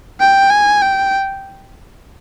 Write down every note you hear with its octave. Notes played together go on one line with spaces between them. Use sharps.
G5
G#5
G5